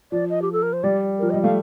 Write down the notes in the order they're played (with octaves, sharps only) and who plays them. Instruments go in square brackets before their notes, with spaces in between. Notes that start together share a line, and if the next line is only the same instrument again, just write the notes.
[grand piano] F3 [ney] D5
[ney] D#5
G4
A4
A#4
C5
[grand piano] G3 [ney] D5
[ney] A#4
[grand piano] F3
[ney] D#5
[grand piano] G3
[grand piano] A3 [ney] F5